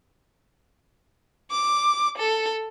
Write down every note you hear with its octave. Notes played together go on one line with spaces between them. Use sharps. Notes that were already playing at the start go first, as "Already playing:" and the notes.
D6
A4